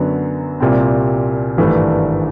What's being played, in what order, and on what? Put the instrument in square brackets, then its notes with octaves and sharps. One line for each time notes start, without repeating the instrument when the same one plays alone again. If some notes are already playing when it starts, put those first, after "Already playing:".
Already playing: [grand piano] F#2 D3 F#3 B3
C2 A#2 G3 C4
G#1 G2 E3 A3 D4